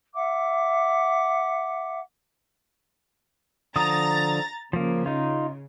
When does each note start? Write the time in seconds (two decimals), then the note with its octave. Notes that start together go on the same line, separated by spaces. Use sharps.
0.12 E5 F#5 D6
3.76 D3 F3 A#5 D#6 A6
4.73 C#3 F3 A#3
5.06 D#4 F4